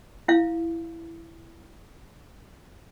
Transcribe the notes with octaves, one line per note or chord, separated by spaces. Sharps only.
E4 F5